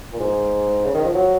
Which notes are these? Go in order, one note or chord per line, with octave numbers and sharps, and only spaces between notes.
A#2
G#2
C#3
D#3
F3
F#3